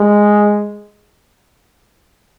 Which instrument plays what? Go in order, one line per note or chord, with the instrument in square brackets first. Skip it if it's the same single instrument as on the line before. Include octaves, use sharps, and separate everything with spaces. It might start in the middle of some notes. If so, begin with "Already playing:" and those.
Already playing: [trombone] G#3